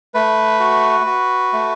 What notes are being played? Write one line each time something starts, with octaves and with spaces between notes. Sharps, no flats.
A3 B4
F#4
F#4
A3